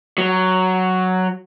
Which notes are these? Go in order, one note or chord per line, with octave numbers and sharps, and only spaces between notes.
F#3